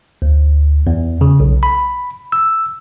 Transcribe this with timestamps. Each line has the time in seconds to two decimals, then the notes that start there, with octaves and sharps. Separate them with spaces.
0.22 D2
0.87 E2
1.21 C#3
1.40 B1
1.63 B5
2.32 E6